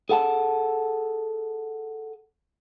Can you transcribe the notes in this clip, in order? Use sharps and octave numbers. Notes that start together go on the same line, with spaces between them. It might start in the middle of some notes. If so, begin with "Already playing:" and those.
G#4 A4 F#5 G#5 A5